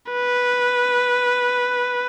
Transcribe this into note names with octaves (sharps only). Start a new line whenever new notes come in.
B4